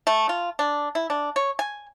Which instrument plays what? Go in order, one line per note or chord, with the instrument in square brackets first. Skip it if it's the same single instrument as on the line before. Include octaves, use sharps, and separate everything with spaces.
[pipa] A3
F4
D4
E4
D4
C#5
G#5